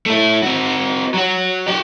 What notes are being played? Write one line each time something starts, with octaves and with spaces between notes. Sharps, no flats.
A3 E4
C4 F#4
F#3 F#4
F#4 G5